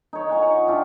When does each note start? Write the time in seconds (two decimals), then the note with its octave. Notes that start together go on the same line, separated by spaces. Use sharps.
0.13 D#4 C#5
0.29 F#5 G#5 A#5
0.42 F#4 C#5
0.67 D4 E4 F4 G4